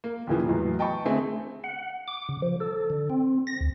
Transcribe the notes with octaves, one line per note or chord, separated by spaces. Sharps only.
A#3
D#2 A#2 C#3 E3 F3
E2 A2 F#3
D#5 G5 A5 B5 C#6
D3 A3 C4 G#4
F#5
D6
C#3
F3
A4
D3
C4
A#6
D2